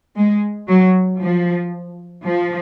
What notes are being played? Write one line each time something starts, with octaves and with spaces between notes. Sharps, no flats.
G#3
F#3
F3
F3